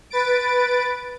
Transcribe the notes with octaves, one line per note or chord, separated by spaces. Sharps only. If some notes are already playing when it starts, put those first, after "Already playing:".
B4 A6 D7